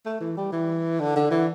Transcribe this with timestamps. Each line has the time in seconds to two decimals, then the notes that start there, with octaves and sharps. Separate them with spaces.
0.06 A3
0.20 E3
0.37 G3
0.52 E3
1.00 D3
1.16 D3
1.31 E3